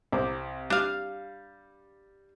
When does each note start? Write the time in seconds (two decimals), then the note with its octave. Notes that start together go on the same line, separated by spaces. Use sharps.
0.12 C2 C5 D6
0.70 G3 D4 F5